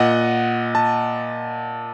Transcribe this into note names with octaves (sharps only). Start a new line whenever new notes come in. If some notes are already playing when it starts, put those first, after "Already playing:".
Already playing: A#2 D#5 F#5
A5